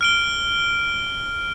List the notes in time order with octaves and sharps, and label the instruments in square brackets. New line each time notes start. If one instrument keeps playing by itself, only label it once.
[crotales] F6 D7 G7